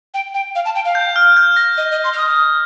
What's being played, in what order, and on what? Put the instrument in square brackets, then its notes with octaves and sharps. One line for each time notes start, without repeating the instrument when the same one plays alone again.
[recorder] G5
G5
F5
A5
G5
F5
[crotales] G6
F6
G6
A#6
[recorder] D#5
D#5
C6
F6
D#6